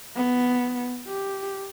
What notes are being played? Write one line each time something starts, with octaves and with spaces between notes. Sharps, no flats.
B3
G4